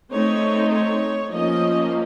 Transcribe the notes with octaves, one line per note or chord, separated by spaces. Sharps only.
A3 C4 D#4 C#5
C#5
F3 A#3 C#4 D#5